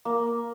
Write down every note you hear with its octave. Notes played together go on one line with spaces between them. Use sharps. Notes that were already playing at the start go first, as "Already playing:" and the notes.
A#3